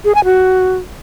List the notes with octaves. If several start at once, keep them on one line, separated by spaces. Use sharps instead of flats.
G#4
G#5
F#4